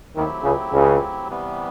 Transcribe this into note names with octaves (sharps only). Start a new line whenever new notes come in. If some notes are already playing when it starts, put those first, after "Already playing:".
D#2 D#3 F#3 A3 C4 E4 G4
C#2 C#3
C#2 C#3
C3 E3 G3 B3